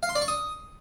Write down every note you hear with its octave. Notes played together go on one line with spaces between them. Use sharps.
F5
C6
D5
C#6
D#6